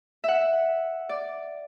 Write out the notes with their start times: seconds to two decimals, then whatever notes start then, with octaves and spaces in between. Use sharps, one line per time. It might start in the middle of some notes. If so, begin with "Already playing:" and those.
0.24 E5 F#5
1.09 D5